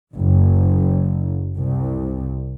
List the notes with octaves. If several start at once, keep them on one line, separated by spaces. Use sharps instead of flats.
F#1
C2